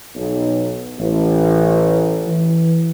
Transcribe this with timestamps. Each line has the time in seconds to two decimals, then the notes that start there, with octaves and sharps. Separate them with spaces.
0.15 B1
0.98 A1
2.27 E3